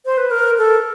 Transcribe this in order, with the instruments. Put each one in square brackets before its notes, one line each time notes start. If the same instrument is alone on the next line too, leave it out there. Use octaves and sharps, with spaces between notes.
[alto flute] C5
B4
A#4
A4